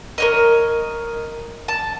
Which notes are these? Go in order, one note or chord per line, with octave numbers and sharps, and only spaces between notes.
A#4 C#5 D#5
A5